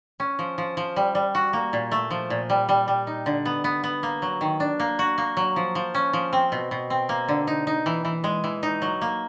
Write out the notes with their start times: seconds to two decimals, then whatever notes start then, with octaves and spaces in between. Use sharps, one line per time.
0.20 C#4
0.39 F3
0.58 F3
0.77 F3
0.96 G3
1.15 G3
1.35 F#4
1.53 A#3
1.73 A#2
1.91 A3
2.11 F3
2.30 A#2
2.50 G3
2.69 G3
2.88 G3
3.07 D#4
3.26 D3
3.45 B3
3.64 B3
3.84 B3
4.03 A#3
4.22 F#3
4.41 D#3
4.60 D4
4.80 A#3
4.99 F#4
5.18 A#3
5.37 F#3
5.56 F3
5.75 F3
5.95 C#4
6.13 F3
6.33 C4
6.52 B2
6.71 B2
6.90 C4
7.09 A#3
7.28 D3
7.47 D#4
7.67 D#4
7.86 E3
8.05 E3
8.24 G#3
8.44 E3
8.63 D#4
8.82 F#3
9.01 A#3